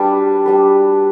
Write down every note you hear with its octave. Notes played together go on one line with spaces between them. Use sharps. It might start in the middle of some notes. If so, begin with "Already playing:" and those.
Already playing: G3 D4 G4 B4
G3 D4 B4